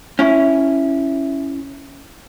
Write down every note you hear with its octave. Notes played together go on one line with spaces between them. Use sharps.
C#4 E4